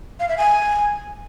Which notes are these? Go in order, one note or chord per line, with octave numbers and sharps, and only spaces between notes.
F5
E5
G#5